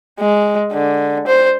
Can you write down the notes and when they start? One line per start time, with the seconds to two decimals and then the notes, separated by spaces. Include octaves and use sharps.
0.20 G#3
0.73 D3
1.27 C5